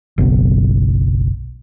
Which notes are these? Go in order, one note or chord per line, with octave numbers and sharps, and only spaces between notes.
F#1 B1 B2 B3